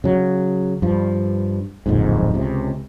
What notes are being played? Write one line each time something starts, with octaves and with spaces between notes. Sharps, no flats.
C#3 F#3
G2 F3
D1 A#1 F2 G#2
C#2 C3